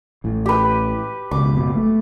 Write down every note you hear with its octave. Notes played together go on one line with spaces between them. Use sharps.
A1 A2
G4 B4
C#2 B2 D6
F#1 B2
A3